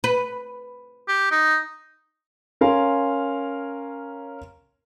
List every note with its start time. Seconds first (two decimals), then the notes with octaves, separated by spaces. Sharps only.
0.04 B4
1.08 G4
1.31 D#4
2.61 C#4 A#4 F5 G#5 C6